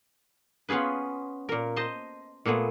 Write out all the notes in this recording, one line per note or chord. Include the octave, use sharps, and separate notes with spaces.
B3 C#4 F4 G#4 B4
A#2 A#4
C5 D#5 A5 C6
A#2 A3 B3 G#4